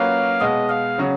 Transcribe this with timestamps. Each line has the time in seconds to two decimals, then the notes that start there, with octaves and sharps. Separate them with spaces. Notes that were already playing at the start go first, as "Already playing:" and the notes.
Already playing: F#3 A#3 C#4 F4 B4 F5
0.40 B2 G#3 B3 D#5
0.69 F5
0.98 C#3 F#3 C#4